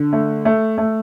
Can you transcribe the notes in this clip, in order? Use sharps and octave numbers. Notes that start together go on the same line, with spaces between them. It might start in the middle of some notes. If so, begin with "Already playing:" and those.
Already playing: D3
A3
A3
A3